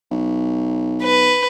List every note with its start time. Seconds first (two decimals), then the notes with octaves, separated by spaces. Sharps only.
0.11 B1
1.03 B4